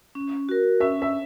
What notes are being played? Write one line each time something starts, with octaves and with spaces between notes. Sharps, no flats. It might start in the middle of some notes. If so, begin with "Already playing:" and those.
C#4
F#4 A#4
C#4 E5
E5